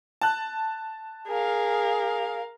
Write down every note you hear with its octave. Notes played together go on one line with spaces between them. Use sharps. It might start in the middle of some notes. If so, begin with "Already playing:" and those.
A5 F#6
G#4 A#4 F5